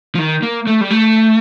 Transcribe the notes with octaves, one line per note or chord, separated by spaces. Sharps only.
F3
D#3
A#3
A3
G3
A3